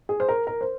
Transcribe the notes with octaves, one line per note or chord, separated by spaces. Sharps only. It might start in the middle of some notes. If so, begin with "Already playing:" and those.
G#4
C5
A#4
A#4
C5